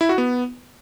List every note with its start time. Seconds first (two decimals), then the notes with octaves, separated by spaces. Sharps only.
0.01 E4
0.09 F#4
0.18 B3